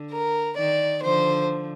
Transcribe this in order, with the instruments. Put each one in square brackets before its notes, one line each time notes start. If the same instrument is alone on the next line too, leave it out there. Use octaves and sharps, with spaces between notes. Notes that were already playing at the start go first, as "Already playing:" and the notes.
Already playing: [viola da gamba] D3
[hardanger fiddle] A#4
[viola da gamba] D#3 [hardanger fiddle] D5
[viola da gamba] D3 F3 [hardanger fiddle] C5